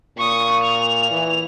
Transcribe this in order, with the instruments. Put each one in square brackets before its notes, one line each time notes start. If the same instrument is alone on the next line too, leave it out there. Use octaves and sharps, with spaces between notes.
[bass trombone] A#2 [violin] C#6 D#6
[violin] F7
[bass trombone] E3